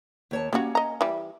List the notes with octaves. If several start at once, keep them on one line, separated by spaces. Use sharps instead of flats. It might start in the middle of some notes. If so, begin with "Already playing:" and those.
D#2 C#5 A5
G3 A#3 C#4 F#4
D#5 A#5
E3 G3